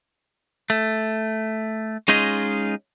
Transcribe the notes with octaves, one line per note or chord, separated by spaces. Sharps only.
A3
G#3 C#4 D#4 F4 G#4 D#5